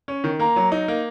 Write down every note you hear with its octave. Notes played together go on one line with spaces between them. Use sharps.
C#4
D#3
A#3 A#5
F#3
D#4
A#3